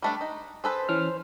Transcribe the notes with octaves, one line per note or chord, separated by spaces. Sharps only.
G3 A3 D4
D#4
G#4 A4 B4 C5
E3 C#4 F6